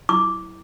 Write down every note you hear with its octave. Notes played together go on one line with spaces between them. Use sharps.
E4 D6